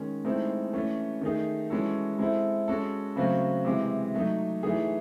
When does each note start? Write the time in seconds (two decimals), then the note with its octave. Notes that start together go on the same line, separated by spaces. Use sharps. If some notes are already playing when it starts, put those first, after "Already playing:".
Already playing: D#3 G#3 C#4
0.24 A2 G#3 C4 D#4 A4
0.73 E3 A3 C#4
1.21 D#3 A3 D#4 G#4
1.70 E3 G#3 C#4 F#4 A4
2.19 G#3 C4 E4 A4
2.68 G#3 C#4 F#4 A4
3.16 C#3 F#3 A3 C4 F#4
3.64 C3 E3 G#3
4.14 F#3 A3 D#4
4.63 E3 A3 D#4 G#4